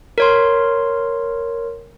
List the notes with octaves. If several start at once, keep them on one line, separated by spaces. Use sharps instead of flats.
A#4 C#5 C6